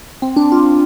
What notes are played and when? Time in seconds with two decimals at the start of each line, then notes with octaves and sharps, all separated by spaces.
0.22 C4
0.36 D4
0.52 F4